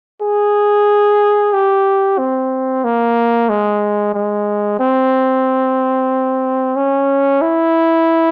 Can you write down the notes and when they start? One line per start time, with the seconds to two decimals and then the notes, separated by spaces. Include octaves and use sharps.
0.21 G#4
1.53 G4
2.18 C4
2.84 A#3
3.49 G#3
4.14 G#3
4.80 C4
6.76 C#4
7.41 E4